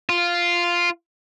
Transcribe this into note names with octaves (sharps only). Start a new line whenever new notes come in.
F4